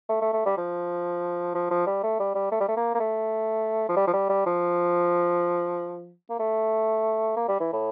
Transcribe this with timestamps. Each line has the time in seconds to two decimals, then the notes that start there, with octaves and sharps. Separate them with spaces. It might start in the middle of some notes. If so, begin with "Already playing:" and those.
0.09 A3
0.22 A3
0.33 A3
0.46 G3
0.58 F3
1.55 F3
1.71 F3
1.87 G3
2.03 A3
2.20 G3
2.35 G3
2.52 A3
2.61 G3
2.68 A3
2.77 A#3
2.95 A#3
3.00 A3
3.89 F3
3.97 G3
4.07 F3
4.13 G3
4.29 G3
4.46 F3
6.30 A#3
6.40 A3
7.36 A#3
7.48 G3
7.60 E3
7.73 A2